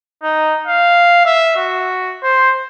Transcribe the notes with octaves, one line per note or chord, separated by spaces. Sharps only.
D#4
F5
E5
F#4
C5